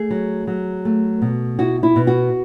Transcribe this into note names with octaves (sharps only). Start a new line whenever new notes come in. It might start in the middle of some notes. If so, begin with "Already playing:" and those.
Already playing: A3 G#4
F#3
F#3
A3
B2
E4 F#4
E4
B2
F#4